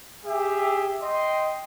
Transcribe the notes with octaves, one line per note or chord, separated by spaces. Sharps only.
G4 G#4 E5
D#5 G5 C6